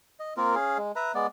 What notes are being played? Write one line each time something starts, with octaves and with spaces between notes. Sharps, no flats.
D#5
A#3 C4 F4 A#4
C#4 G#4 F5
G#3
B4 E5 A#5
G#3 B3 D5